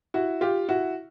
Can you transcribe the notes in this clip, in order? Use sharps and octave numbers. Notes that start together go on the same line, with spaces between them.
E4 F#4
F4 G4
E4 F#4